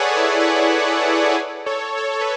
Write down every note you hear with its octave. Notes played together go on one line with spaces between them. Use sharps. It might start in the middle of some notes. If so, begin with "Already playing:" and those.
Already playing: G#4 A4 B4 C#5 D5 F#5
E4 G#4
G#4 B4
A4 C#5
A4 C#5
A4
B4